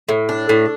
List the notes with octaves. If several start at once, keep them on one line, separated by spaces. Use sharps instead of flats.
A2
D4
A2